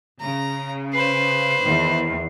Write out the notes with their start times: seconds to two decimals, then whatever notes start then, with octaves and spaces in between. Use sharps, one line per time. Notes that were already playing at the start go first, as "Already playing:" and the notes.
0.20 C#3 A#5
0.93 B4 C5 C7
1.62 E2 D#3